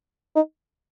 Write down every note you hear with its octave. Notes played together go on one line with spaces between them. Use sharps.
D#4